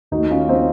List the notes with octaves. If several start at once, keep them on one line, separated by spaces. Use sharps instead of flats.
D#2 D#3 A3 D#4 F#4
C#4 F4
C4 D#4